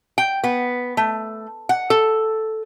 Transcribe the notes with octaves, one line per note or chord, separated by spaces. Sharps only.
G5
B3
A3
F#5
A4